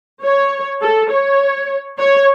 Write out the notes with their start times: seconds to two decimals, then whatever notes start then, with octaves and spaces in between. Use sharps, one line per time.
0.23 C#5
0.82 A4
1.10 C#5
1.99 C#5